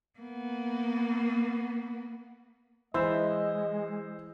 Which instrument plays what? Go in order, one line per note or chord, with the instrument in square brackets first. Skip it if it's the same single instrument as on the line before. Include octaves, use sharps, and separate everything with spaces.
[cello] A#3 B3
[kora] E3 E4 [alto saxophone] G#3 [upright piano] C5 E6 [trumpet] D#5